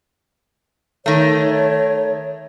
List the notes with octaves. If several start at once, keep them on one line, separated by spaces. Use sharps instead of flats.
D#3 A3 C#5